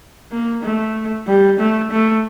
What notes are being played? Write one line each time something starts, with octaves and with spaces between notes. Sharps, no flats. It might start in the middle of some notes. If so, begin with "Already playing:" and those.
A#3
A3
G3
A3
A3